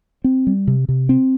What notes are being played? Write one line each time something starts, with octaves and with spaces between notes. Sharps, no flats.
C4
G3
C3
C3
C4